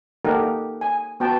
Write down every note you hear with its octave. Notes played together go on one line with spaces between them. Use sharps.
A#3 D#4 G4 A4 A#4 F#5
G#5
B3 F#4 G5 A5